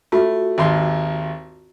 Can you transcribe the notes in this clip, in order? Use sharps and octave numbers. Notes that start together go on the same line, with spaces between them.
A3 F4 F#4
G#1 D#2 C6